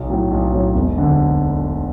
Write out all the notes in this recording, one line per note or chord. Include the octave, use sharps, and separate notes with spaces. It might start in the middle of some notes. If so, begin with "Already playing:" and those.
Already playing: B1
A2 F#3 C#4
B1
A2 F#3 C#4
E1
D2 D3